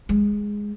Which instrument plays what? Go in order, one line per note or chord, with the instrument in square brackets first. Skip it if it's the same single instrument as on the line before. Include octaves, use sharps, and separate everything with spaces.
[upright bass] G#3